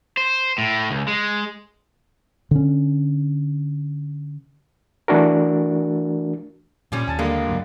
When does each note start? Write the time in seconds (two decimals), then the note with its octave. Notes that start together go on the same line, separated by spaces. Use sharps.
0.17 C5
0.58 A2
0.91 C#2
1.08 G#3
2.51 D3 C#4
5.08 E3 A3 D4 F#4 A#4
6.92 A#2 F3 G3 C#4
7.08 D#2 G#5 A5 A6
7.19 D3 G3 G#3 A#3
7.48 C#2 G2 F#3